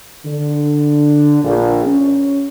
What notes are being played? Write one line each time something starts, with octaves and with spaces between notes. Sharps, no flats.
D3
A#1
C#4